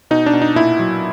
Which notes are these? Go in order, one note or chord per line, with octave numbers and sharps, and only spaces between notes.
B2 D#4
D4
B2
D#4
A#2 E4
F#3